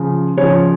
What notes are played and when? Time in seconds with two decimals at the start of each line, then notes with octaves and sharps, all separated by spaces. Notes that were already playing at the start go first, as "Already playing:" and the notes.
Already playing: C#3 F3
0.37 C#3 F3 C#5